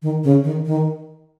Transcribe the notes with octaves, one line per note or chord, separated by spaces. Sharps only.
D#3
C#3
D#3
D#3